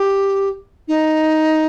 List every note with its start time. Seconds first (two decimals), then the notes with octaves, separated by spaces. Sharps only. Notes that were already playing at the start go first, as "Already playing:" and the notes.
Already playing: G4
0.88 D#4